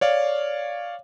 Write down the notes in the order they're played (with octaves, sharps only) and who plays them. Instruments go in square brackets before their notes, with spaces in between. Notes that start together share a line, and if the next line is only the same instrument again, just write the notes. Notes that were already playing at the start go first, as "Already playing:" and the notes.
[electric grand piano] C#5 D5 F5